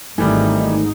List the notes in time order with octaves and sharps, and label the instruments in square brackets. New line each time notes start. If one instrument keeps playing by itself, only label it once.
[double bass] G#1 [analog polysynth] G#2 D#4 [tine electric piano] D#3 A3 [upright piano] E3 G3